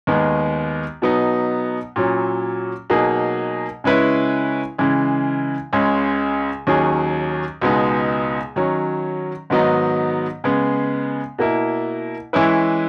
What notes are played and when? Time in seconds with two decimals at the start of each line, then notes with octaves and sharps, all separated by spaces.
0.07 D#2 D#3 G#3 B3
1.02 B2 F#3 B3 D#4
1.96 A#2 F#3 C#4
2.90 B2 F#3 A#3 D#4 G#4
3.84 C#3 G#3 C#4 E4 B4
4.78 C#3 E3 G#3
5.73 C#2 C#3 G#3 C#4
6.67 D#2 D#3 F#3 C#4 G#4
7.61 C#2 B2 G#3 B3 D#4
8.56 D#3 F#3 C#4
9.50 G#2 D#3 F#3 B3 D#4
10.44 C#3 G#3 B3
11.39 B2 A#3 E4
12.33 E3 G#3 C#4 E4 B4